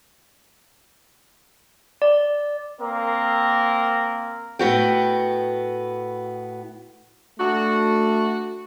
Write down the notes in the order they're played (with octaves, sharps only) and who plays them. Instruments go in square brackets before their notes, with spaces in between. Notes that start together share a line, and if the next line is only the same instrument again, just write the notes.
[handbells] D5
[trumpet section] A#3 C4 A#4
[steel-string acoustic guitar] A2 B3 F#4 G5
[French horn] A3 [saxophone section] D4 F#4